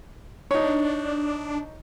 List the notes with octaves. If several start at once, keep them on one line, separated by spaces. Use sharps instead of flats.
D4 D#4 C#5